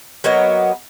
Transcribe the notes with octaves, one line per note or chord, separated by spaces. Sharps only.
F#3 A#3 B3 D#5